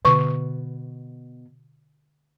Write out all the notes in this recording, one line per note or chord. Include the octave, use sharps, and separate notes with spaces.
B2 D3 C#6